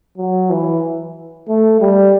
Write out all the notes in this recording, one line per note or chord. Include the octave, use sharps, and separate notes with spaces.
F#3
E3
A3
G3